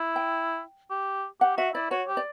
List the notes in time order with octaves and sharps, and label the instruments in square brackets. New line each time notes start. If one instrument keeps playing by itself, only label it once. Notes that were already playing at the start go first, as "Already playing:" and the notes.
Already playing: [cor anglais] E4
[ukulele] G5
[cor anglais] G4
[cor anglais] G4 [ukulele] F#5
[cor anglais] F#4 [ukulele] E5
[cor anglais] E4 [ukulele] D5
[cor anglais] F#4 [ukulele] C#5
[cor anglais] G4
[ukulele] D5